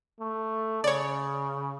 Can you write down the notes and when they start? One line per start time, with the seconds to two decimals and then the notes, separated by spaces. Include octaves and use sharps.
0.20 A3
0.84 C#3 C#5 D5